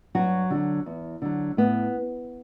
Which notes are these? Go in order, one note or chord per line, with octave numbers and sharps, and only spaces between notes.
G2 F#3 F#4
D3 F#3
E2
D3 F#3
A2 B3